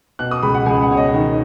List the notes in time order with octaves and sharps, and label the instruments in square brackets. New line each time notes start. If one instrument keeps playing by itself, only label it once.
[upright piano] B2 F#6
D#6
C#2 B5
F#5
C#2 G#5
F#5
B2 C#5
D#5
D#3